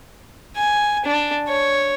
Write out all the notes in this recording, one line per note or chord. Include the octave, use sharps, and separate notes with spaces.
G#5
D4
C#5